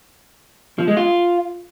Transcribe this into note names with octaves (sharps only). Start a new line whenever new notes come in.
F3
G#3
F4